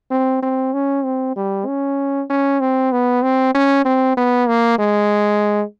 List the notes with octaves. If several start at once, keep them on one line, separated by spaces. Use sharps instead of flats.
C4
C4
C#4
C4
G3
C#4
C#4
C4
B3
C4
C#4
C4
B3
A#3
G#3